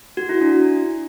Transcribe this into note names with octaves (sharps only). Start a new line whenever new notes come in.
F#4
E4
D4